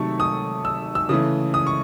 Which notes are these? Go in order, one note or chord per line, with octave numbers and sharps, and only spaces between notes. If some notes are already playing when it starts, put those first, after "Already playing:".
Already playing: C3 D#3 F#3 A3 A5 C#6
D#6
E6
E6
C#3 E3 A3 D#6
D#6
C#6